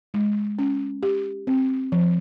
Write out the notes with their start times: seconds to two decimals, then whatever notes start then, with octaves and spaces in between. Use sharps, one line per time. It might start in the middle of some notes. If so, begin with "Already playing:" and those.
0.14 G#3
0.59 C#4
1.03 G4
1.47 C4
1.92 F3